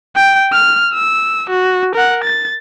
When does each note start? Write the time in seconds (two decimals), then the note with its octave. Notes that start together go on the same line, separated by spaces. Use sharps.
0.16 G5
0.53 F6
0.94 E6
1.50 F#4
1.95 A#4 F#5
2.25 A6